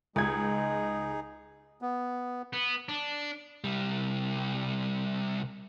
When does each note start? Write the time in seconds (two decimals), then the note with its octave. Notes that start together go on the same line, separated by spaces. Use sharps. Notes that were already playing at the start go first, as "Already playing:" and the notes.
0.16 C#2 G#3 D#4 G#4 G#6
1.82 B3
2.53 B3
2.89 D4
3.64 C2 G3